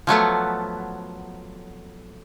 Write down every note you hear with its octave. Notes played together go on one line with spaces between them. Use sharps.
F3 F#3 A3 B3